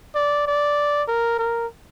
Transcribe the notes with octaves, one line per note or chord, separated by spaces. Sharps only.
D5
D5
A#4
A#4